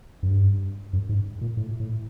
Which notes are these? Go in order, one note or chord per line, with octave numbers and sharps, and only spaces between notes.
F#2
G2
F#2
G#2
A#2
A2
A2